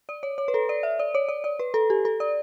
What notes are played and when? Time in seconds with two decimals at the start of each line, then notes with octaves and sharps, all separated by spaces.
0.09 D5
0.23 C#5
0.38 C#5
0.48 B4
0.54 A4
0.69 D5
0.83 E5
0.99 D5
1.15 C#5
1.29 D5
1.44 D5
1.59 B4
1.74 A4
1.90 G4
2.05 A4
2.20 D5